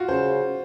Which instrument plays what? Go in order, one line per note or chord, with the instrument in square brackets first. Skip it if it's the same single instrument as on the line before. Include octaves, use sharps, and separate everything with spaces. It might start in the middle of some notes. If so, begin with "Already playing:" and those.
Already playing: [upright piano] F4 F#4
[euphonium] C#3 [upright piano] C5